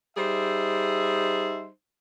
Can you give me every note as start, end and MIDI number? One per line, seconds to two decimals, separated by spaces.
0.17 1.67 55
0.17 1.67 63
0.17 1.67 68
0.17 1.67 72
0.17 1.67 76